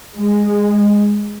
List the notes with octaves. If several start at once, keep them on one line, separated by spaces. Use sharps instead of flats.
G#3